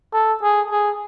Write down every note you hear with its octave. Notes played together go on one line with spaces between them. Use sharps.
A4
G#4
G#4